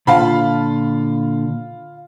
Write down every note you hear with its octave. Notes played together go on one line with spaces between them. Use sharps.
A#2 D3 F4 F5 A5 B5